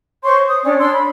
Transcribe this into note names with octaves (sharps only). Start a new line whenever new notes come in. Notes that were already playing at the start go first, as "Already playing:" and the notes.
C5 C#5 C6 C#6
D#6
C#4 D4 D5
D4 C#5 C6 E6
B5